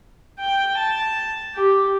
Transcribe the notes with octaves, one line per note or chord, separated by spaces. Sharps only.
G5
A5
G4